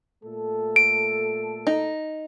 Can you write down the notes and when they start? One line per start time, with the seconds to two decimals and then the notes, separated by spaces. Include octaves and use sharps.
0.24 A#2 A3 A4
0.76 D7
1.67 D#4